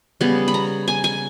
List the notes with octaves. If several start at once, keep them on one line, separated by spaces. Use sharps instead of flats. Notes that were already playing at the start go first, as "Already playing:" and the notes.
C#3 G3 B3
B5
A#5
G#5
G#5